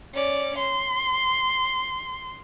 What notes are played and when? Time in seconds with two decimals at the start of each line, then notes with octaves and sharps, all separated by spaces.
0.14 C#4 D5
0.58 C6